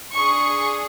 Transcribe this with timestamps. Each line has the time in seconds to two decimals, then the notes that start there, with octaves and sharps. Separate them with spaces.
0.14 D4 G#4 C#6